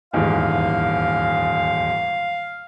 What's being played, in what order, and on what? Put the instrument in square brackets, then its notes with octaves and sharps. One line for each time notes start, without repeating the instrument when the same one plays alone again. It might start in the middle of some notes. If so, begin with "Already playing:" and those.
[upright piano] D#1 E2 G#2 [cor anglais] F5